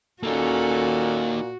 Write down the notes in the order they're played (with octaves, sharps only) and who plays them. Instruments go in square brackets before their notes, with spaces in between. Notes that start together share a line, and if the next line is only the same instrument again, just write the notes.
[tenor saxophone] A#2 [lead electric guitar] A#3 D#4 [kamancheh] C#4 A4 [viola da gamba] F#4